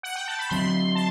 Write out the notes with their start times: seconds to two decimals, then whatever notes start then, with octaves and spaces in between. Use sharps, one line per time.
0.03 F#5
0.15 G5
0.28 A5
0.39 B5
0.49 D3 F#3 C4 C6
0.95 A5